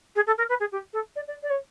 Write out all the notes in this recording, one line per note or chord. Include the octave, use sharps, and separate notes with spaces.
G#4
A4
A#4
B4
G#4
G4
A4
D5
D5
D5
C#5